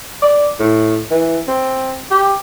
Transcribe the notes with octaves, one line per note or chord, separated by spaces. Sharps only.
D5
A2
E3
C4
G4